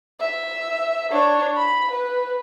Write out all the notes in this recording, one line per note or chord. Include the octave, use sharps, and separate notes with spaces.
E5
D4 C#5
B5
B4